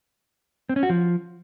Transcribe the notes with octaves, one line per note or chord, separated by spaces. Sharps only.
C4
C#4
F#4
F3